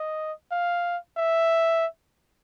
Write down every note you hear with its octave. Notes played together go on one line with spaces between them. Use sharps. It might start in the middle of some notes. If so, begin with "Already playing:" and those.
Already playing: D#5
F5
E5